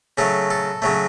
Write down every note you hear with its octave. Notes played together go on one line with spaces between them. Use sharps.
C#3 F#3 A3 A4
A4
C#3 F#3 A3